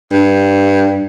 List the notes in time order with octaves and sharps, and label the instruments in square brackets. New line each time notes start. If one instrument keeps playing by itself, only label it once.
[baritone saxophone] G2